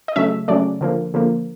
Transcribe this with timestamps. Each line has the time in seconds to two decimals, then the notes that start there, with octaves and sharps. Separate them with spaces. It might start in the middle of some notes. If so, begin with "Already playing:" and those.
0.08 D#5
0.16 C#3 F#3 A3 E5
0.48 C#3 F#3 A3 D5
0.81 D3 F3 A#3
1.14 D3 F3 A#3